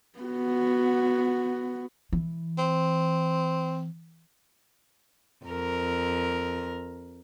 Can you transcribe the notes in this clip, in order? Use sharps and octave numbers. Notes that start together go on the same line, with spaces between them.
B3 F#4
E3
C4
F2 A#4